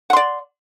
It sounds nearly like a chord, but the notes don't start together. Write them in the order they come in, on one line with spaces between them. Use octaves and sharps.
F#5 C6 D5